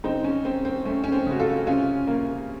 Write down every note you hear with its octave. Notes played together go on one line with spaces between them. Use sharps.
C#3 C4 D#4
C#4
C4
C4
A3 C#4
C#4
C4
C#3 F#4
F4 A4
C3 C#4 F4
A#3